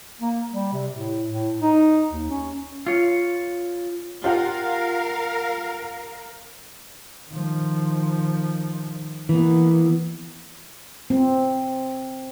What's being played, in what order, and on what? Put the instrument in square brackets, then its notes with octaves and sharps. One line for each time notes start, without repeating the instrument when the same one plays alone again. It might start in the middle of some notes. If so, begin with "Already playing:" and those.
[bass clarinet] A#3
G3
C3
A2
A2
D#4
D#2
C#4
[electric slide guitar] F4 C#5
[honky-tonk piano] F4 G4 F#5 [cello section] A#4 F5
[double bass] D#3 F3
[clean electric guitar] E3 [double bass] A#3 B3
[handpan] C4